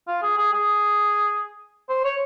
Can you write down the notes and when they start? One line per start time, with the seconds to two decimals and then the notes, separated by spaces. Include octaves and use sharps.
0.07 F4
0.22 G#4
0.37 G#4
0.53 G#4
1.89 C5
2.04 C#5